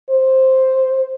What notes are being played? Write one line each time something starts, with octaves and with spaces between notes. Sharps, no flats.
C5